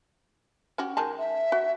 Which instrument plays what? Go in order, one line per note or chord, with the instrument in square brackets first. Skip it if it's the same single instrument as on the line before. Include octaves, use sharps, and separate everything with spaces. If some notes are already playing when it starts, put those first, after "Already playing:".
[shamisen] C#4 F#4 G4
D#3 G#3 A5
[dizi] E5
[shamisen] F#4